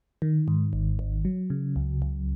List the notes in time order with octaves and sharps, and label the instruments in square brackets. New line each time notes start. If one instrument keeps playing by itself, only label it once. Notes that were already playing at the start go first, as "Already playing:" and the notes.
[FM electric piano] D#3
G#2
G#1
G#1
F#3
C#3
C#2
C#2